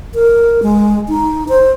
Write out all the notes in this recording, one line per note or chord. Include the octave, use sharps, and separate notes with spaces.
A#4
G#3
D#4
C5